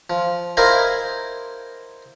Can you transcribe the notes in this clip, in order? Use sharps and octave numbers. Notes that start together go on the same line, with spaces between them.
F3
E4 A#4 C5 D#5 F5 G#5